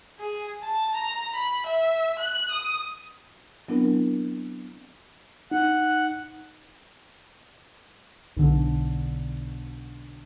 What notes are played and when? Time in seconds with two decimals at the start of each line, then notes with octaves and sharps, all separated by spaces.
0.20 G#4
0.63 A5
0.95 A#5
1.34 B5
1.66 E5
2.19 F#6
2.51 D#6
3.68 F#3 B3 C4 D4 E4 A#4
5.51 D#4 F#5
8.37 B1 D3